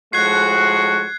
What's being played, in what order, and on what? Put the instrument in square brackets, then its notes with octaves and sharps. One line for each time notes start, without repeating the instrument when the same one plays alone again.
[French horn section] A2 F3 G#3 [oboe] F#4 [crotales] F#6 G#6 C7